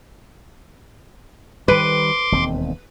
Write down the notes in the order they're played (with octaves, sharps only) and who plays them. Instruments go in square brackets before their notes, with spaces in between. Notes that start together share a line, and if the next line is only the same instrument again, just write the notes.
[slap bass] D#3 G3 [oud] B4 [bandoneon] C6 D6
[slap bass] E1 D#2 C4